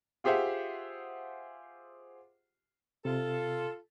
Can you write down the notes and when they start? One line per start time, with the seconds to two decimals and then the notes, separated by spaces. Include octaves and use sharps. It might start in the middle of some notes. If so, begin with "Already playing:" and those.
0.24 F4 G4 G#4 C5 E5 F#5
3.05 C3 F4 A4